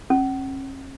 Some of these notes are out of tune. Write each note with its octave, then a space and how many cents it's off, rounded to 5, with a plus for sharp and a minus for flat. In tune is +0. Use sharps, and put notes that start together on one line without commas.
C#4 -45